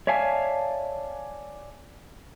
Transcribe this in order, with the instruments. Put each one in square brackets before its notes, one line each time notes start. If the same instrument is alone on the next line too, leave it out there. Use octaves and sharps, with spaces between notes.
[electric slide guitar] C#5 D5 E5 F5 G#5 A5